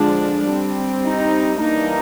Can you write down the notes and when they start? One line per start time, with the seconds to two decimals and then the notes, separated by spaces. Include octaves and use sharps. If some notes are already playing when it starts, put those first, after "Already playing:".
Already playing: D3 F3 G#3 D4
0.49 G3 C4
1.04 D#4
1.60 E3 G3 A#3 D4 D#4